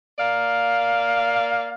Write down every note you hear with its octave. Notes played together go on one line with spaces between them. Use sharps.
A#3 D5 F5